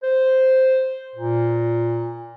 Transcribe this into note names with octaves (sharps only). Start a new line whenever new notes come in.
C5
A#2